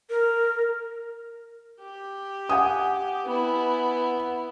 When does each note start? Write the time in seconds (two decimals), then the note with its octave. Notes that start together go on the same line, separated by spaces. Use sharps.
0.10 A#4
1.81 G4
2.49 F#5 G#5 D#6
3.26 B3 E4